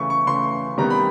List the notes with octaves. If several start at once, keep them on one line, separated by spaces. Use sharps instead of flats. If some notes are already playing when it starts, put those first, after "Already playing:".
Already playing: C#3 E3 A3 C#6
C#6
C#3 E3 A3 C6
C3 D#3 G3 B3 A#5
B5